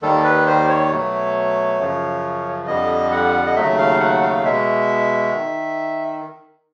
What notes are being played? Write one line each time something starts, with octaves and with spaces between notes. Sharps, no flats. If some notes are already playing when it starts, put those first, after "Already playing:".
D#2 D#3 G3 A4
B4
C5
C#5
B2 F#3 A3
F#2 C#3 F3
F2 D3 G3 D#5
F#5
D#5
D#2 C#3 F#3 A3 E5
F5
F#5
F5
B2 G#3 E5
D#3